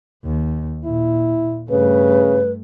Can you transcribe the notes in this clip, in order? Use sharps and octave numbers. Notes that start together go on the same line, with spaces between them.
D#2
A#2 E4
G2 C#3 A3 B4